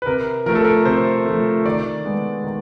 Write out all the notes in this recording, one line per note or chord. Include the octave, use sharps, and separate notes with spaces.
B4
C3 A#4
F3 A3 A#4
A4
A#4
C3 C5
F3 A3
D#3 D5
G#3 B3
D#3